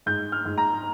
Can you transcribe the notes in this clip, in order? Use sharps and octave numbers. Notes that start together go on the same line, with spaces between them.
G#2 G6
F6
G#2
A#5